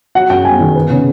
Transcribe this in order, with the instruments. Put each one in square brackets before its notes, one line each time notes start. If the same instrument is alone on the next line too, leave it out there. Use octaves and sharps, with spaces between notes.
[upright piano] F#3 F#5
F#2 G5
G1 G#5
D#3
B3
C#3